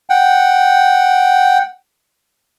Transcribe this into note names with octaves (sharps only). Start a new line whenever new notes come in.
F#5 G5